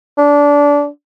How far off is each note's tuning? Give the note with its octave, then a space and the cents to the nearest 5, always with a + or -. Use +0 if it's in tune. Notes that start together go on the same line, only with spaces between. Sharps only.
D4 -20